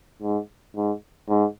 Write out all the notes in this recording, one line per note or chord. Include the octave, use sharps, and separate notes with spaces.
G#2
G#2
G#2